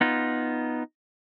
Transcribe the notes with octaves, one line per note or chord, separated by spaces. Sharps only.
B3 D#4 F4